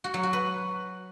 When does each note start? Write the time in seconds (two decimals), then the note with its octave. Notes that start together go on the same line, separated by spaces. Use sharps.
0.04 F#4
0.14 F#3
0.23 F#4
0.33 B4